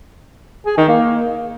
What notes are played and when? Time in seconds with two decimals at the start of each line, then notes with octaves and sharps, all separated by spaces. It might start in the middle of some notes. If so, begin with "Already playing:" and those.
0.66 G#4
0.77 D#3
0.88 A#3